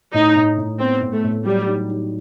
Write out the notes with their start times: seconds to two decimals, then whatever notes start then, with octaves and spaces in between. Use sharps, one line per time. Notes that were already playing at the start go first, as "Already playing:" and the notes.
0.14 A2 D#4
0.36 A2
0.58 A2
0.79 B3 C4
1.02 A2
1.13 A3
1.24 A2
1.45 F#3 G3
1.68 D#4
1.90 D#4